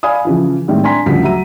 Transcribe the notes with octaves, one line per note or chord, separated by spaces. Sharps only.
D5 F5 G#5 B5 D#6
C#3 E3 F3
A2 D#3 G3 G#3 C4
D4 G#5 A#5 C6 B6
G1 D2 C#3 F3 B6
F#3 E5 A#5 D#7